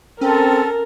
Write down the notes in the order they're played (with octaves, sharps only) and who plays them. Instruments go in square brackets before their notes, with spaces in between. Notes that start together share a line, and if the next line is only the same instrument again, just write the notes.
[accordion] C4 [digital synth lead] C#4 [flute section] A4 [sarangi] A#4